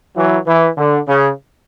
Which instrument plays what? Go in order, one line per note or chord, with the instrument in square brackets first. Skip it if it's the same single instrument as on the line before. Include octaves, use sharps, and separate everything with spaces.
[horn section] E3 F#3
E3
D3
C#3